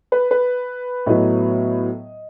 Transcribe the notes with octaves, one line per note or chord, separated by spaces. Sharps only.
B4
B4
A2 F#3 B3 D#5